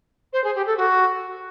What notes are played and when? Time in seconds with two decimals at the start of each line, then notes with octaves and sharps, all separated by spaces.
0.33 C5
0.44 G#4
0.55 G4
0.66 A4
0.77 F#4